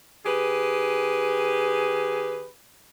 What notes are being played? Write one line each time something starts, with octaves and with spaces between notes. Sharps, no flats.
D#3 G4 G#4 B4